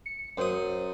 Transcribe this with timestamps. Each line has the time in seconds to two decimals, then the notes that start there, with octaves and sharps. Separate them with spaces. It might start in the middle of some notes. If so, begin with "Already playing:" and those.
0.06 C#7
0.38 F#2 C5 D#6